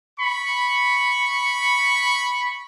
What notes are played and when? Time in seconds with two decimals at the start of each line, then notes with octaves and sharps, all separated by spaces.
0.18 B5 C#6